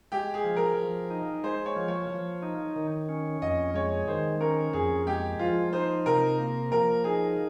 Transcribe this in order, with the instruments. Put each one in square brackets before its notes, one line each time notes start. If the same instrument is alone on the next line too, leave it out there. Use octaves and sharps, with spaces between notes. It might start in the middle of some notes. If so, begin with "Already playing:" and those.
[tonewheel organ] G#3 [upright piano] G4
[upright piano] G#4
[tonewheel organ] F3
[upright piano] A#4
[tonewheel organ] F3
D#4
[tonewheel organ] G#3 [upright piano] C5
[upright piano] C#5
[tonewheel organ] F3
[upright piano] C#5
[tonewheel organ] F3
D#4
D#3
C#4
[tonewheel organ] F2 [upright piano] D#5
[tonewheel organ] G#3 [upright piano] C#5
[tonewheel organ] D#3 [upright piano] C5
[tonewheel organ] C#4 [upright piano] A#4
[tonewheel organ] F2 [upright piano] G#4
[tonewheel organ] G#3 [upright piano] G4
[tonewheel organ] F3 [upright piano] F4
[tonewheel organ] D#4 [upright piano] C5
[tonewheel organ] C3 [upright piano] A#4
[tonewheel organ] A#3
[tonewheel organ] F3 [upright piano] A#4
[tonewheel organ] D#4 [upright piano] G#4